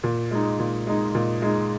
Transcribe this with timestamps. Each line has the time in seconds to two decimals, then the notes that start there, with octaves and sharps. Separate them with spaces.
0.04 A#2
0.31 G#3 D#4
0.60 A#2
0.87 G#3 D#4
1.15 A#2
1.42 G#3 D#4